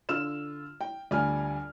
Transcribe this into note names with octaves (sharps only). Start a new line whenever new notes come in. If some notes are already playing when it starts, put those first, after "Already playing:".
D3 F4 E6 F6 E7
G5
D2 G3 F4 G#5 F6